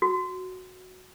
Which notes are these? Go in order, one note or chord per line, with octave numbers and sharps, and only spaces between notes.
F#4